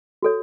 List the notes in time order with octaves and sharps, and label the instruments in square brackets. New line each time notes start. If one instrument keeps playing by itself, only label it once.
[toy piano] F#4 A4 C#5